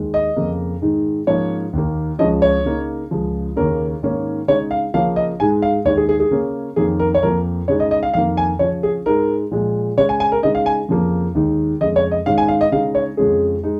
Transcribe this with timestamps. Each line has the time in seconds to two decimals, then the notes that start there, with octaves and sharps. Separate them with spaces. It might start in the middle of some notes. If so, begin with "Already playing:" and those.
Already playing: D#2 D#3 G#3
0.14 D#5
0.36 F2 C#3 A#3
0.82 G#2 D#3 G#3 D#4
1.27 G#2 F3 A#3 C#4 C#5
1.73 D#2 D#3 A#3
2.19 C#2 C#3 F3 C#4 D#5
2.42 C#5
2.65 C#3 A#3 D#4
3.11 C#2 C#3 F3
3.56 D#2 C#3 A#3 C#4 A#4
4.03 G#2 D#3 A#3 C#4
4.48 C#3 G#3 D#4 C#5
4.71 F5
4.94 C#3 F3 A#3 C#4 F5
5.16 D#5
5.40 G#2 G#3 D#4 G#5
5.62 F5
5.85 D#2 D#3 G#3 C#5
5.97 G#4
6.09 G#4
6.20 G#4
6.31 C#3 A#3 C#4
6.76 F2 D#3 A#3 C#4 G#4
6.99 A#4
7.15 C#5
7.23 F2 F3 A#3 A#4
7.68 C#3 G#3 D#4 C#5
7.80 D#5
7.91 D#5
8.03 F5
8.14 F2 D#3 A#3 F5
8.37 G#5
8.59 C#3 F3 C#4 C#5
8.83 G#4
9.06 G#2 G#3 D#4 A#4
9.51 A#2 F3 G#3
9.97 C#3 G#3 C#4 C#5
10.09 G#5
10.20 G#5
10.32 A#4
10.43 C#3 G#3 D#4 D#5
10.55 F5
10.66 G#5
10.89 F2 C#3 F3 A#3
11.35 D#2 D#3 G#3 D#4
11.81 F2 C#3 G#3 D#5
11.96 C#5
12.11 D#5
12.26 G#2 D#3 G#3 C#4 F5
12.38 G#5
12.48 F5
12.61 D#5
12.72 C#3 G#3 D#4 F5
12.95 C#5
13.17 F2 C#3 F3 G#3 C#4 G#4
13.63 G#3 D#4